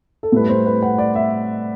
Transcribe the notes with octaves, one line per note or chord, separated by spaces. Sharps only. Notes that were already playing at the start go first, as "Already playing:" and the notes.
A4
A2 G3 B4
C5
B4
F#5
D5
E5